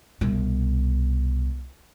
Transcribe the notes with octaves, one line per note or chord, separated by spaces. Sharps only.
C2 B2